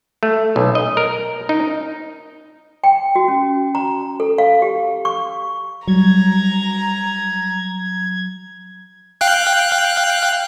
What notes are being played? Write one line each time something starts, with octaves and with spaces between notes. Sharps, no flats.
A3
B1
D#5
A#4
D#4
G5
F#4
C#4
A#5
A4
F5
G4
C#6
F#3 G3 A#5 G#6
F5 G5 F#6